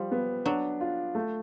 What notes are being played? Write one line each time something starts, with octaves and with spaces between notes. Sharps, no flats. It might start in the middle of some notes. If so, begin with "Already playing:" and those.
Already playing: F3 G3
B3
F#3 D4
F4
A3